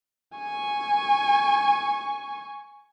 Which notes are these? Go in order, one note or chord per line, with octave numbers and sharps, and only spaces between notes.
G#5 C#6